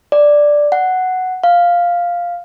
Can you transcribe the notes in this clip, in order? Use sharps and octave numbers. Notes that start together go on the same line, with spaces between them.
D5
F#5
F5